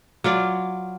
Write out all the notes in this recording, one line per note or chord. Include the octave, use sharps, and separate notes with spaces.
F#3 F4 D5